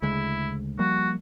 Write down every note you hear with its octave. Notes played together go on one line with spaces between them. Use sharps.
D2 C#3 G#3 E4
F3 G3 A#3 F#4